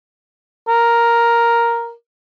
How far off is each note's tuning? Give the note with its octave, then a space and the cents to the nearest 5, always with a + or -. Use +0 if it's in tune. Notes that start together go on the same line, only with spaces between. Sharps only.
A#4 +5